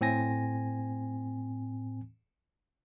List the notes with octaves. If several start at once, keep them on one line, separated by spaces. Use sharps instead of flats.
A2 C4 G#5 A#6